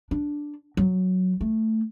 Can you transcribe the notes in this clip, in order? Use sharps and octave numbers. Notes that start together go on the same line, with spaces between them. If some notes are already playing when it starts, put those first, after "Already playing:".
D4
F#3
A3